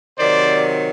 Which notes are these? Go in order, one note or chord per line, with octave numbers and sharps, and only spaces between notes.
C3 D#3 F#3 C5 D5